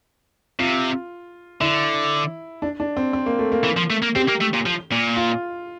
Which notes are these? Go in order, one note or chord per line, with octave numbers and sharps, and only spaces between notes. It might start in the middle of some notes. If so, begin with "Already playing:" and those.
C3 F4
D3 E4
D4
D4
C4
C4
A#3
A3
A#3
E3
F3
A3
A#3
C4 G4
A#3
A3
A#2
F3
A#2
F4